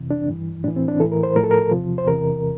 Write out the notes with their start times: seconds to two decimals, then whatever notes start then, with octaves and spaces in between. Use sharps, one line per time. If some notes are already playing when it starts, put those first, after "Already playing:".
Already playing: F2 C3 E3
0.10 D4
0.28 G2 E3
0.64 A2 E3 D4
0.76 C4
0.88 D4
1.00 E3 A4
1.04 A2
1.12 A#4
1.23 C5
1.36 A2 F3 A#4
1.43 A4
1.51 A#4
1.71 E2 C3 F3
1.98 C5
2.07 E2 C3 E3 A#4